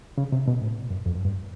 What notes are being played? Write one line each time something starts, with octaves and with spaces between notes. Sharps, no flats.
C#3
C3
B2
A2
F#2
F2
F#2
G2